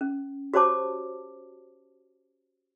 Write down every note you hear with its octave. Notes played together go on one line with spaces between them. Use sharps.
C#4
F#4 G4 C5 C#5 A5 D6